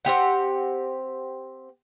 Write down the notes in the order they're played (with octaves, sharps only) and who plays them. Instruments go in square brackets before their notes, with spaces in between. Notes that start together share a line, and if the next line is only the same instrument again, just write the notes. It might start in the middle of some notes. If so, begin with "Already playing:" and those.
[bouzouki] C4 E4 G4 F#5